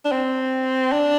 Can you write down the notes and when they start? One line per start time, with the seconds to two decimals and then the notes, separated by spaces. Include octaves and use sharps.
0.05 D4
0.12 C4
0.92 D4